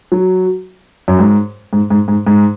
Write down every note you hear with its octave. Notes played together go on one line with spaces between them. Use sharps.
F#3
F#2
G#2
G#2
G#2
G#2
G#2